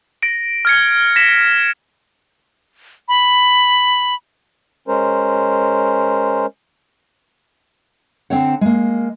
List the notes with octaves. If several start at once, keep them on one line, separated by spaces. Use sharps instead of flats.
A#6 D7
F6 G#6 C#7
A#6 B6 E7
B5
G#3 C#4 A#4 C5
D3 C4 C5 C#5 F#5
G#3 A#3